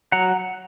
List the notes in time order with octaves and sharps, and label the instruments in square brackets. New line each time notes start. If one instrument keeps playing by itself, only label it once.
[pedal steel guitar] F#3 F#5 A#5